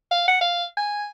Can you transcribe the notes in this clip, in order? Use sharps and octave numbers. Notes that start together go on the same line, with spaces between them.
F5
F#5
F5
G#5